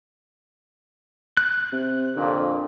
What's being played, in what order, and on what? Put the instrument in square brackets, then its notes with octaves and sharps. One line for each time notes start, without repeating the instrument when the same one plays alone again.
[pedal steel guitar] F#6
[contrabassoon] C3
[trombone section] F2 A#2 [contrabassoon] D3